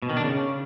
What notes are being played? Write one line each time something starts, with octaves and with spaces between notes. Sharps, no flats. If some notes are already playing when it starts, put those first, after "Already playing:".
B2
D#3
D4
C#3